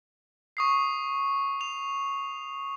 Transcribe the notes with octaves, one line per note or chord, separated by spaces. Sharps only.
C#6 D#6 C7
F7